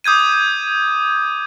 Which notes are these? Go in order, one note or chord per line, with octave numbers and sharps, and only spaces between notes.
D6 D#6 G6 G#6 D#7